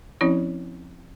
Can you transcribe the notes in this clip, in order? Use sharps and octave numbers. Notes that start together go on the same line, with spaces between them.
F3 C4 C#4 E4 C#5